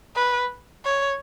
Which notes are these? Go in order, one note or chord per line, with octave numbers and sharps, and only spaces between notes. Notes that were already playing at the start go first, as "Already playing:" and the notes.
B4
C#5